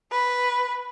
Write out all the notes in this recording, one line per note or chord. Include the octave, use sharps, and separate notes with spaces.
B4